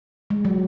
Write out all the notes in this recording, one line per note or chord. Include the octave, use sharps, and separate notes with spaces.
G#3
F#3